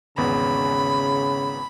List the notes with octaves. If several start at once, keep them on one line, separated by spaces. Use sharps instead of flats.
G#1 E2 C#3 B3 B5